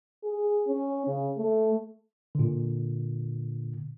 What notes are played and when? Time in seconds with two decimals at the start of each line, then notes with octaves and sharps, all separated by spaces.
0.24 G#4
0.67 C#4
1.07 C#3
1.38 A3
2.35 A#2 D3